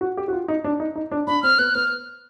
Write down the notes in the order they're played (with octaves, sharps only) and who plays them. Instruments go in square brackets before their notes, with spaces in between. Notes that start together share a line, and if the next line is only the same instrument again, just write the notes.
[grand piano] F#4
G4
F#4
F4
D#4
D4
D#4
D#4
D4
[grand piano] D4 [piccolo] B5
[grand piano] C4 [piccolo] F6
[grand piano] B3 [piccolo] F#6
[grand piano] B3 [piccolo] F6